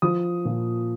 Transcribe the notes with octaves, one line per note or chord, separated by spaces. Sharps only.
F3 D#6
A#2